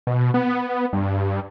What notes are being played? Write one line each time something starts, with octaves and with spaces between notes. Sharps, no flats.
B2
B3
G2